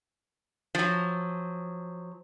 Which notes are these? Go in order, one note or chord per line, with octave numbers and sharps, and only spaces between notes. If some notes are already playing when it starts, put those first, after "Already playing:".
F3 F#3